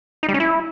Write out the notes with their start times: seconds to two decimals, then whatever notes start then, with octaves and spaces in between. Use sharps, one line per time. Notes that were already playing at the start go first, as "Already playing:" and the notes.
0.23 D#4
0.29 G3
0.34 C#4
0.40 E4